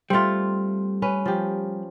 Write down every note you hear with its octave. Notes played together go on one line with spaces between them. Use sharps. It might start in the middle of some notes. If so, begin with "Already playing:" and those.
G3 A3 C4 F4
C#4 B4
F3 G4